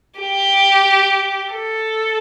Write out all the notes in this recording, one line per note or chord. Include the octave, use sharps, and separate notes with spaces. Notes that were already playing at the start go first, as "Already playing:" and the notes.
G4
A4